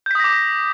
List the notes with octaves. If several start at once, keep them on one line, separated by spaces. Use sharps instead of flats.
D6 D#6 G6 A#6 B6